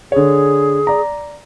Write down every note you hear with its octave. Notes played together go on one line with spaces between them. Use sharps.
D3 G#4 C#5
D5 A#5